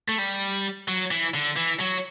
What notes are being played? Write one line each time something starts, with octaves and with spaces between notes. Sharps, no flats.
A3
G3
F#3
E3
D3
E3
F#3